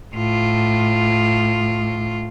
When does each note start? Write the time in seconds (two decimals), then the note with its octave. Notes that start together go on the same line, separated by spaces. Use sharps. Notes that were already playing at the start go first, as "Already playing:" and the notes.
0.15 A2 F4